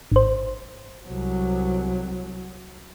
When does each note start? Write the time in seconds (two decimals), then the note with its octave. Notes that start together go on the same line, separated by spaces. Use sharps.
0.12 G#1 C5
1.06 C2 F#3